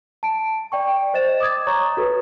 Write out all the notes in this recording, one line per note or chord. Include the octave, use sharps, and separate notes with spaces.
A5 D7
D5 G5 C#6
C5 D#5 A6 E7
D6 D#6 G#6 A6
C#5 A#5 C#6
F#4 A4 B4